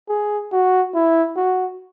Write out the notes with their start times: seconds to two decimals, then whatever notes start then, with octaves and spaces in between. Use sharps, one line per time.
0.09 G#4
0.52 F#4
0.95 E4
1.36 F#4